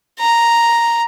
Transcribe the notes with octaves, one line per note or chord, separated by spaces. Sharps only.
A#5